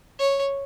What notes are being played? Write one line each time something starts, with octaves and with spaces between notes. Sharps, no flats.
C#5